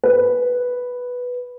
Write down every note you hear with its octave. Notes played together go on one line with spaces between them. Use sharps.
B4